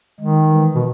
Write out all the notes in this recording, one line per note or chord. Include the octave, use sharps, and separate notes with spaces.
D#3 G#3
E3
B2